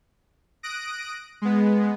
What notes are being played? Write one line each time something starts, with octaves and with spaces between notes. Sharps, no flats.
D#6 F#6 A#6 D7
G#3 B3